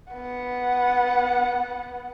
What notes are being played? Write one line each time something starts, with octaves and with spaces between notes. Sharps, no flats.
B3 F#5